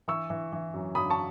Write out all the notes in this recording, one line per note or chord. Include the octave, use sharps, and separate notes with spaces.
E3 C#6 E6
E3
E3
F#2
F#2 B5 D#6
A5 C#6